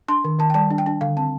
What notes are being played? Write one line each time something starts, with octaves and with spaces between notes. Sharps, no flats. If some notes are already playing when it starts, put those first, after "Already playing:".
D4 C6
D#3
D#3 A5
G5
G3 A5
D4
G5
D4
D3 F5
C4 A5